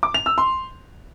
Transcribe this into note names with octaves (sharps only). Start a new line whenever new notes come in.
D6
F7
E6
C6